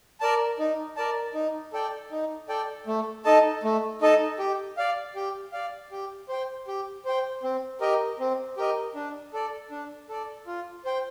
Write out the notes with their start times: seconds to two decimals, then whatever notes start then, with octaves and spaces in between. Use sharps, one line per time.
0.21 A#4 D5 A5
0.59 D#4
0.97 A#4 D5 A5
1.34 D#4
1.73 A4 D5 G5
2.11 D#4
2.49 A4 D5 G5
2.87 A3
3.25 D#4 A4 D#5 A5
3.63 A3
4.01 D#4 A4 D#5 A5
4.39 G4
4.77 D5 F5
5.16 G4
5.52 D5 F5
5.92 G4
6.29 C5 G5
6.67 G4
7.05 C5 G5
7.43 C4
7.81 G4 A#4 D#5
8.20 C4
8.57 G4 A#4 D#5
8.95 D4
9.33 A4 D5
9.71 D4
10.09 A4 D5
10.47 F4
10.85 C5 G5